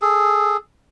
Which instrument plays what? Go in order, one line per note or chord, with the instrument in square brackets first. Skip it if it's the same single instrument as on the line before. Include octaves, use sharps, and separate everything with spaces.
[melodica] G#4 A4